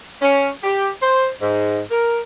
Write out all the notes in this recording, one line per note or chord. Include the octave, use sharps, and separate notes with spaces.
C#4
G4
C5
G#2
A#4